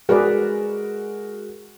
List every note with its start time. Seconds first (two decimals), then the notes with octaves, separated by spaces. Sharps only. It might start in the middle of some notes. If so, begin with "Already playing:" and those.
0.09 G#3 F#4 G#4 A#4 B4 D5